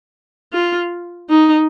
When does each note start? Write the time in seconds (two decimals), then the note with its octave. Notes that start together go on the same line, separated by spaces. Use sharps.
0.53 F4
1.30 D#4